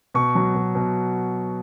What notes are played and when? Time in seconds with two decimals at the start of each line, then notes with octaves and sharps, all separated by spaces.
0.14 B2 C#6
0.35 F#3
0.55 B2
0.75 B2